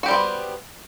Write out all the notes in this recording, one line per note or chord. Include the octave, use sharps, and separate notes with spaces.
G3 B3 F#4 G4 C5